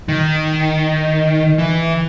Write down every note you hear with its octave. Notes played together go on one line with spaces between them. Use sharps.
D#3
E3